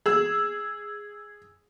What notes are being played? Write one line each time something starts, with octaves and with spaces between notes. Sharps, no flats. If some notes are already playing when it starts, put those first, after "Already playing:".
G#4 E6